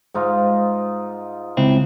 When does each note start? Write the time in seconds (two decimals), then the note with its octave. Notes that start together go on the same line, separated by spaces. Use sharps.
0.14 G#2 D#4 F4
1.57 C#2 C4 E4